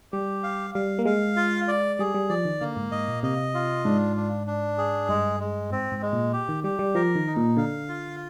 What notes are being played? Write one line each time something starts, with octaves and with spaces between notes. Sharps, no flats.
G3 G4
F5
G3 F5
A#3
G#3 F5
F4
D5
G3 G#4
G3
F3 D5
D#3
D3 A#3
G#2
G#2 D#5
A#2
C3 D#5
F4
G#2 D4
D4
D4
G#4
G2 G#3
G#3
G#2 C4
G#2
G#3
A#2
G4
D#3
G3 G4
G3
F3 A#4
D#3
D#4
A#2
D3 F5
F4